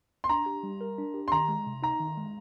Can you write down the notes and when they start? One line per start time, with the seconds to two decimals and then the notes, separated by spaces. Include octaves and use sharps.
0.24 C6
0.29 D4 A#5
0.46 G4
0.63 G3
0.81 A#4
0.98 D4
1.14 G4
1.28 C6
1.32 D#3 A#5
1.49 G#3
1.67 C3
1.83 D#4 A#5
2.00 D#3
2.17 G#3